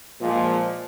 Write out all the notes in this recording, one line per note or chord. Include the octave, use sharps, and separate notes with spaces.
A#2 F3 G#3